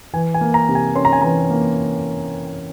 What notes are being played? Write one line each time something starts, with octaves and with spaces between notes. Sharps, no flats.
E3 G#5
G#5
A#3
A#5
C3
G#5
C#4 C6
A#5
G#5
E3 A#5
A#3